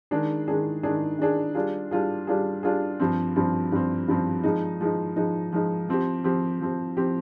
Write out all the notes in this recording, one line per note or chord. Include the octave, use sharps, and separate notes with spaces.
D#3 G#3 D4 G#4
D#3 G#3 D4 G#4
D#3 G#3 D4 G#4
D#3 G#3 D4 G#4
G3 D4 F4 G#4
G3 D4 F4 G#4
G3 D4 F4 G#4
G3 D4 F4 G#4
G2 F3 C4
G2 F3 C4
G2 F3 C4
G2 F3 C4
F3 G#3 D#4
F3 G#3 D#4
F3 G#3 D#4
F3 G#3 D#4
F3 C4 G4
F3 C4 G4
F3 C4 G4
F3 C4 G4